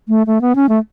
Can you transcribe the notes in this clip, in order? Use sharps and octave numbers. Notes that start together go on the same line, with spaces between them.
A3
A3
B3
C#4
A3